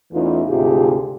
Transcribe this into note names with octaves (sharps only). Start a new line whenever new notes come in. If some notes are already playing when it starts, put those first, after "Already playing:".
E2 E3 A3 C#4 D#4 F4
D2 G#2 C3 F4 G4 G#4